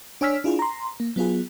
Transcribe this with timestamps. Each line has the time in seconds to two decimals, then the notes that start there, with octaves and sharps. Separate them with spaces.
0.21 D4 C#5 G#5 E6 F6 B6
0.44 D4 E4 F4 G#4
0.59 A#5 C6
1.00 A#3
1.16 F#3 B3 F4 G#4